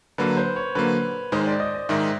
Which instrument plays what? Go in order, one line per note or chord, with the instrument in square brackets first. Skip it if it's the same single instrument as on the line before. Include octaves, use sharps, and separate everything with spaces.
[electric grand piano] D3 F#3 A#3 [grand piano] B4
[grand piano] C5
C#5
[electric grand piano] D3 F#3 A#3 [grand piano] B4
[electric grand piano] G#2 D#3 G#3 [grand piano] C5
[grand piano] D5
D#5
D#5
[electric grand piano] G#2 D#3 G#3 [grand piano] E5